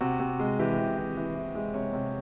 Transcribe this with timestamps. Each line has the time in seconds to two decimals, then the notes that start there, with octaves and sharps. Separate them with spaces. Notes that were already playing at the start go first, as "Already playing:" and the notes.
0.01 C3 F#4
0.20 C3
0.40 G#3
0.59 E3 G4
0.78 C3
0.97 E3
1.17 E3
1.35 E3
1.55 G#3
1.74 C3 C#5
1.93 C3